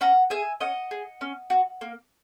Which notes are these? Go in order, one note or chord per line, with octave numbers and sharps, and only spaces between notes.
C#4 F#5 A#5
G#4 E5 G#5
C#4 D#5 F#5
G#4
C#4
F#4
A#3